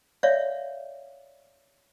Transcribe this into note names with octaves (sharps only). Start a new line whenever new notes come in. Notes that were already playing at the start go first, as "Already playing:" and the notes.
C#5 D5 E5 F5